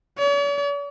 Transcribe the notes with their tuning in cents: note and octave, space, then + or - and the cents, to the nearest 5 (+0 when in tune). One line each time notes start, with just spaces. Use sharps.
C#5 +45